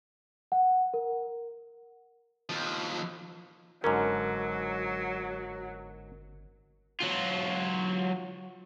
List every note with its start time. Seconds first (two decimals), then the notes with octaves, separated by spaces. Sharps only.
0.52 F#5
0.94 A#4
2.50 D#2 F3
3.84 G1 G#2 D3 F#3 C#4 A#4
7.00 F#3 F4